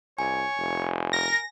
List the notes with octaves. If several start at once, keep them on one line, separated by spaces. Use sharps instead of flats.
C2 C#5 G#5
F1
A#4 A#6